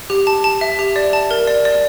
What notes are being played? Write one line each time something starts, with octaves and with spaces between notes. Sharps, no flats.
G4
A5
A5
E5
G4
D5
A5
A#4
D5
D5